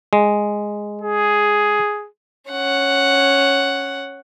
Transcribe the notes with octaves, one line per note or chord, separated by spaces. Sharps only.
G#3
G#4
C#4 F#5